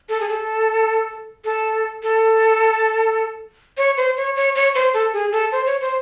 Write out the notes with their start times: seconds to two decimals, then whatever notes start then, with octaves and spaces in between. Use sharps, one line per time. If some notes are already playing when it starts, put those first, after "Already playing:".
0.09 A4
0.21 G#4
0.29 A4
1.45 A4
2.03 A4
3.77 C#5
3.97 C5
4.17 C#5
4.36 C#5
4.55 C#5
4.75 C5
4.94 A4
5.13 G#4
5.32 A4
5.52 C5
5.66 C#5
5.81 C5